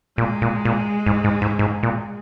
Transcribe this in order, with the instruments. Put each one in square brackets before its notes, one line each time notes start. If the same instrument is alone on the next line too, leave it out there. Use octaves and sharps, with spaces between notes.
[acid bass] A#2 [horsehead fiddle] G#3
[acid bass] A#2
A#2
G#2
G#2
G#2
G#2
A#2